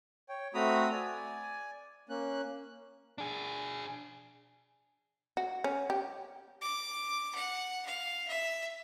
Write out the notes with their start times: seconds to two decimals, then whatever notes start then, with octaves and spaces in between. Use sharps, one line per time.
0.29 C#5 G5
0.54 A3 C4 F#4 A#5 B5 D#6
0.92 D5 G#5
2.09 A#3 C#4 F#6
3.18 D4 G#4
5.37 F#4
5.64 C#4
5.90 G4
6.61 D6
7.35 F#5
7.86 F5
8.28 E5